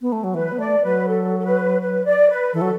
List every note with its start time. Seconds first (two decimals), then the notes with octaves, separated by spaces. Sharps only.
0.02 B3
0.12 A3
0.24 F#3
0.34 E3 B4
0.52 B3
0.59 A3 D5
0.83 F#3 B4
1.07 A4
1.38 A4
1.44 B4
1.81 B4
2.05 D5
2.29 B4
2.53 E3 A4
2.61 F#3